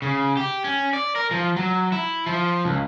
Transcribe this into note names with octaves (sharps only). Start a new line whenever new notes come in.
C#3
G4
C#4
D5
A#4
F3
F#3
E4
F3
C#2